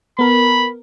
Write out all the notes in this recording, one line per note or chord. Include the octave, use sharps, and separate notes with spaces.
B3 A#4 B5